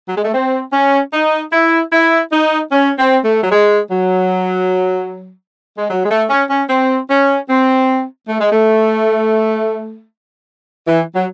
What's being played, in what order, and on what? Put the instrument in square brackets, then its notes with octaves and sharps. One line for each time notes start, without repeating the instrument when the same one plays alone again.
[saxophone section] F#3
G#3
A3
C4
C#4
D#4
E4
E4
D#4
C#4
C4
A3
F#3
G#3
F#3
G#3
F#3
G#3
A3
C#4
C#4
C4
C#4
C4
A3
G#3
A3
E3
F#3